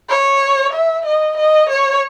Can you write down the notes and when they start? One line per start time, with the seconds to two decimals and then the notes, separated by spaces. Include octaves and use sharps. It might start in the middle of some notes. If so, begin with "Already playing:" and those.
0.09 C#5
0.72 E5
1.05 D#5
1.37 D#5
1.69 C#5